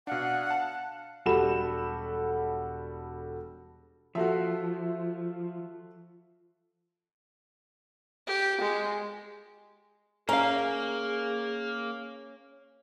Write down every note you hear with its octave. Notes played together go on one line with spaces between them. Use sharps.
B2 D4 F5 F#5
A5
E1 G3 F#4 A4 B5 E7
F3 F#4 A4 E5
G4
G#3
A#3 C#4 G#4 F5 A#5